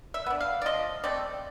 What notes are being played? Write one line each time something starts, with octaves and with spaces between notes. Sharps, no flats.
E5
B3 D4
F5
D5
F3 D#5
A3 C4 D5